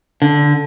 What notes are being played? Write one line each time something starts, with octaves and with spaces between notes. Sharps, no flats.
D3